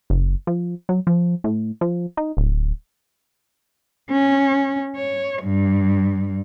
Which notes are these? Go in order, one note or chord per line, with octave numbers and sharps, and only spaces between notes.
F#1
F3
F#3
F3
A2
F3
D#4
D1
C#4
C#5
G2